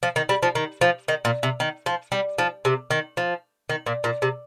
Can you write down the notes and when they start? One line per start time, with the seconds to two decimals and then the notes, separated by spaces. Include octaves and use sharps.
0.03 F3
0.16 D#3
0.29 G3
0.43 F3
0.55 D#3
0.81 F3
1.08 D#3
1.25 A#2
1.43 C3
1.60 D#3
1.86 F3
2.12 G3
2.38 F3
2.65 C3
2.91 D#3
3.17 F3
3.70 D#3
3.86 A#2
4.04 A#2
4.22 C3